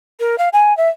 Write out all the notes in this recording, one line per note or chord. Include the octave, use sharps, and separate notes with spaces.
A#4
F5
G#5
E5